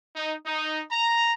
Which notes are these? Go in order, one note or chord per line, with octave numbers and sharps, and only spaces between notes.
D#4
D#4
A#5